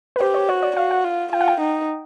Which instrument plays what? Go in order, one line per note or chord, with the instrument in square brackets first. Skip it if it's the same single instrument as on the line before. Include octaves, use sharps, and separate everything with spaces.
[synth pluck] B4
[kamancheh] G4 [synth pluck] C5
[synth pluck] C#5
[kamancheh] F#4 [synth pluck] C#5
[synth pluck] D5
[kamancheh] F#4 [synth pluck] F5
[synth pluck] F#5
[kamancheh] F4
[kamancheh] F4 [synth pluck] G5
[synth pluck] F#5
G5
[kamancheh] D#4